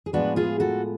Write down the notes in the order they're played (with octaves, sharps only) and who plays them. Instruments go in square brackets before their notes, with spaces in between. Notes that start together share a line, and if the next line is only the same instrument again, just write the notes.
[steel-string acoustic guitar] G#4
A2 F3 G#3 B3 D4 F#4
F4 G#4
F#4 A4